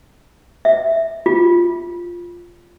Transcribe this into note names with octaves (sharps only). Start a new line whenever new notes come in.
E5
F4